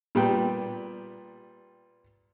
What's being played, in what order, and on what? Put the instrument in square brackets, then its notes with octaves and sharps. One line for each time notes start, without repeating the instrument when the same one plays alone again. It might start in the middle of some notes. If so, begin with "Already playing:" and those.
[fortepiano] A#2 G3 B3 G5